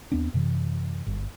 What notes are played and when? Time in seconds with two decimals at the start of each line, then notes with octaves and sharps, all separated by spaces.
0.12 D#2 B3 C4 D4
0.34 F#2 C3 E3
1.07 G1